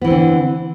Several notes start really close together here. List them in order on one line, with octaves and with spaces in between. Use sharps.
B3 E3 C4 D3